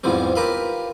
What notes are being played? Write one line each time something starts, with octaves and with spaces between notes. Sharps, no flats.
E2 G#2 E3 F3 G3 C4
F4 G4 A#4 B4 E5 F5